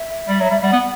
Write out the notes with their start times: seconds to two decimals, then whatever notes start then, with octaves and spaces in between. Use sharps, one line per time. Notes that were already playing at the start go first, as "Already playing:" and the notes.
Already playing: E5
0.28 G3
0.40 F#3
0.51 G3
0.63 G3 F#5
0.73 B3